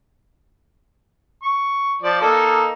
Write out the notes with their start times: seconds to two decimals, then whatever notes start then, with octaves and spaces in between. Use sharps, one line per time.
1.43 C#6
2.02 F3 D5
2.21 A#3 D#4 A4